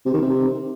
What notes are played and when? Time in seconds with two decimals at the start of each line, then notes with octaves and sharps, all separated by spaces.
0.05 C3
0.14 D#3
0.22 C3